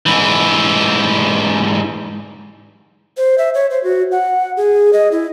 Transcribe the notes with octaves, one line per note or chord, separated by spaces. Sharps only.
G#2 E3
C5
E5
C#5
C5
F#4
F#5
G#4
D#5
E4